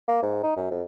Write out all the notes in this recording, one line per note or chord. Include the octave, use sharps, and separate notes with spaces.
A#3
G#2
D#4
F#2
F2